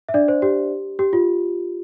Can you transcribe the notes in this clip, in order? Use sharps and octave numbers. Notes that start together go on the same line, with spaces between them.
E5
D4 D5
C5
G4
G4
F4